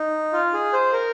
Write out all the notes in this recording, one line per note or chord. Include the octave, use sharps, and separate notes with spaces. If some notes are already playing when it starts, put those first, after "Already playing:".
Already playing: D#4
F4
G#4
C5
A#4